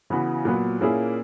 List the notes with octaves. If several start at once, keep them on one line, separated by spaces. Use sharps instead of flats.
C#3 E3 B3 F#4
A#2 F#3 B3
A#2 A#3 C#4 E4 G#4